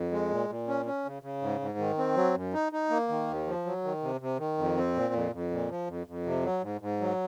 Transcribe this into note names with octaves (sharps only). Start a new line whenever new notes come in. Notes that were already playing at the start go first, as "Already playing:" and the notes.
Already playing: F2
G#3
A#2
A#2
C#4
C#4
C#3
C#3
G#2
G#2
D#3
C4
F#3
F#2
D#4
D#4
A#3
D#3
D#2
F3
F#3
D#3
C3
C3
D#3
F2
C4
A#2
F2
F2
A#2
F3
F2
F2
C3
F#3
G#2
G#2
F#3